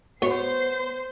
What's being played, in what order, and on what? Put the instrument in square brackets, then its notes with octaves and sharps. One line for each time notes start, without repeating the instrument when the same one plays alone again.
[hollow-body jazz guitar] B3 [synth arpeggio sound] F#4 [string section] C5 C7 [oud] C#5